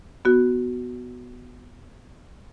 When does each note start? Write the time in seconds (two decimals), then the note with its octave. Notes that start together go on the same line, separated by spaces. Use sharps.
0.25 B3 F#4